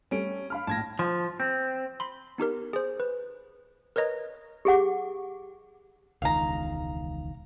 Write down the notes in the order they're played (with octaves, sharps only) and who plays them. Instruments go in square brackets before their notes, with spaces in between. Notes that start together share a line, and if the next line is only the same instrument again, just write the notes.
[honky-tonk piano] G3 A3 [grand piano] C#4 D7
[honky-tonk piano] F5 B5 F6
[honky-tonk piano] A#1 A2 [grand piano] A5 G#6 A#6
[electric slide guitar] F3
C4
[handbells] B5 C6
B3 D#4 G4 A#4
G#4 C5
B4
A#4 B4 C#5 D#5 A#5
[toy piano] G4 G#4 F#5 D6
[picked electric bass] E1 C#2 D#3 [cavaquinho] F5 A#5